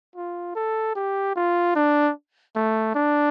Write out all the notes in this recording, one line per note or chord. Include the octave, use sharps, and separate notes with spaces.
F4
A4
G4
F4
D4
A3
D4